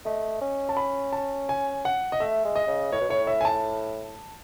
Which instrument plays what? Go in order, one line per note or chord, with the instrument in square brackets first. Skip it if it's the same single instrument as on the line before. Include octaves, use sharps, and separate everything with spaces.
[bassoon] A3 [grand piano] D#5
[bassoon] C#4
[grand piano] A5
B5
A5
G#5
F#5
D#5
[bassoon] A3 [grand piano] E5
[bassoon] G#3
[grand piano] D#5
[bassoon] C#3
[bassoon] A2 [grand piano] C#5
[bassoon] B2
[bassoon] A2 [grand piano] C#5
[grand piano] E5
G#5
A5